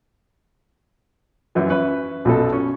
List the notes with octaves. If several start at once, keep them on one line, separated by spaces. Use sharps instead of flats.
F#2 E3 F#3
C#4 B4 E5
B1 F#2 B2 F#3 A4
C#4